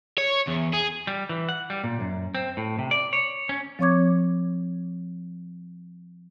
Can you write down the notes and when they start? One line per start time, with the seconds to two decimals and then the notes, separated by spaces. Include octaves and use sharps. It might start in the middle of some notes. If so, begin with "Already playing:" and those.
0.18 C#5
0.47 E2
0.73 G#4
1.07 G3
1.29 E3
1.49 F#5
1.70 G3
1.84 A#2
2.00 F#2
2.35 C4
2.57 A2
2.79 C3
2.91 D5
3.13 C#5
3.49 C#4
3.79 F3 C4 C#5 C#6 D6 G#6